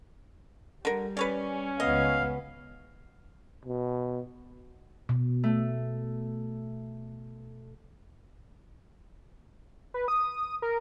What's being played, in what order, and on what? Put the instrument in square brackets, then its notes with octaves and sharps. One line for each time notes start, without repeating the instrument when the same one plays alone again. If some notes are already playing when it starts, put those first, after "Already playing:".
[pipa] D3 A#4 [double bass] G3
[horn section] C#4 [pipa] B4 C#5 D5
[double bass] C#2 B3 [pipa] D#5 [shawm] F5
[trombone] B2
[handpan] B2
[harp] A3
[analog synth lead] B4
D#6
A#4